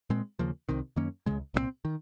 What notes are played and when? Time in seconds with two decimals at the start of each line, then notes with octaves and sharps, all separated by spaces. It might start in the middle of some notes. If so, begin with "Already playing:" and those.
0.10 A#2 G#3 C4
0.39 D#2 C#3 F3 A#3
0.69 C2 C3 D#3
0.96 F#2 D#3 A#3 C#4
1.26 C#2 C#3 G#3
1.54 C2 A#2 F#3 C4
1.85 D#3